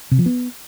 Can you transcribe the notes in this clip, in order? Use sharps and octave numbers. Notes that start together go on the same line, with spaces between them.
C3
F3
B3